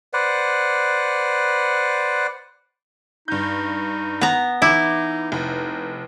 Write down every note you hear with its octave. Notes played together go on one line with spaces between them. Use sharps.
B4 C5 D5 F#5
G2 D#4 G6
B3 A#5
E3 D#4 E4 D6
F1 D#4